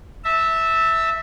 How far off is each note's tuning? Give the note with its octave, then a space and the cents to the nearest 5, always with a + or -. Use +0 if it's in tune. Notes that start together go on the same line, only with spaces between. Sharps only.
E5 -10 A5 +25